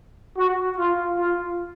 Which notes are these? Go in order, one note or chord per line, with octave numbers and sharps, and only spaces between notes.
F#4
F4
F4